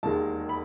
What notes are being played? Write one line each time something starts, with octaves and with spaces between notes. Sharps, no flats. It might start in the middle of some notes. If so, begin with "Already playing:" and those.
E1 D#2 D#3 G#3 A5
B5